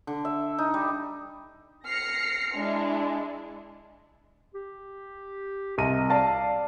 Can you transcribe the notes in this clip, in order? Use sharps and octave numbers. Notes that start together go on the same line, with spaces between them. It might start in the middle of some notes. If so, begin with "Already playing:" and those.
D3
E5
D#4
G3
F6 A#6 C7 C#7
G#3 D4 E4
G4
C2 D#5 D#7
D5 F5 A5